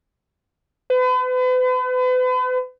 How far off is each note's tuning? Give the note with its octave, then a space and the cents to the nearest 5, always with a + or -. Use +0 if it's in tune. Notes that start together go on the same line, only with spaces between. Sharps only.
B4 +40